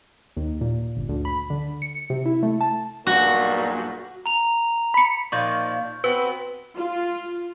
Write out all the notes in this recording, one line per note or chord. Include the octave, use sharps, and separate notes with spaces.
D#2
A#2
G1
D2
B5
D3
C#7
C3
E4
A3
A5
B1 G2 A#2 F#4
A#5 F7
B5 C#7
A#2 D#3 F3 C#6 G6
B3 C4 F#4 B4
F4